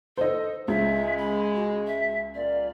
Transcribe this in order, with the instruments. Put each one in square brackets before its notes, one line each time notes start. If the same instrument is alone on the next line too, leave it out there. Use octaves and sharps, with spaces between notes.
[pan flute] A4 [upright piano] C5 D#5
[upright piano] C#2 [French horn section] G#3 [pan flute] E5
[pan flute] B5
F#4
E5
[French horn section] A#2 F4 [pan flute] D5